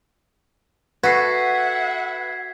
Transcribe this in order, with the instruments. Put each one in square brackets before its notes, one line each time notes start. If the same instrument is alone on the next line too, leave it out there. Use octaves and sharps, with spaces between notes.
[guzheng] F#4 A4 [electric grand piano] B4 [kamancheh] E5 F#5 [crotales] G#6 B6 C7